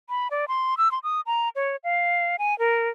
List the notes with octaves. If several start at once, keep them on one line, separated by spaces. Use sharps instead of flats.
B5
D5
C6
E6
C6
D#6
A#5
C#5
F5
G#5
A#4